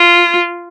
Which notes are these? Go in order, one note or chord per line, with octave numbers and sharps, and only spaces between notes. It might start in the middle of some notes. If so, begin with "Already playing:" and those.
Already playing: F4